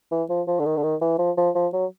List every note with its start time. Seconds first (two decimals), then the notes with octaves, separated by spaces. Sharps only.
0.11 E3
0.29 F3
0.47 F3
0.59 D3
0.66 D#3
0.77 D3
0.83 D#3
1.01 E3
1.18 F3
1.37 F3
1.55 F3
1.73 F#3